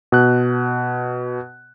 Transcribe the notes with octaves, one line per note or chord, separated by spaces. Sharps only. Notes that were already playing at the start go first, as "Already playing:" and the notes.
B2 F#6